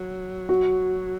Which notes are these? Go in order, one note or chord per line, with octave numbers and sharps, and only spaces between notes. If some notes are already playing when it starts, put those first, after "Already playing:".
Already playing: F#3
F#4